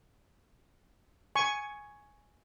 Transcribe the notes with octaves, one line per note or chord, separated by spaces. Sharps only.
G#5 C#6